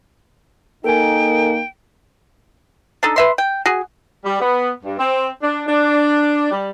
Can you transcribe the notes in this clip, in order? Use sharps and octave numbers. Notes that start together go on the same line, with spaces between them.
A#3 D#4 A4 A#4 G5 G#5
D4 D#4 A4
B4 E5 C6
G5
F#4 G#4
G3
B3
G2
C4
D4
D4
G3